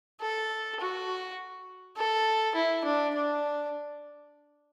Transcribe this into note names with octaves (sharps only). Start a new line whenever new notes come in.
A4
F#4
A4
E4
D4
D4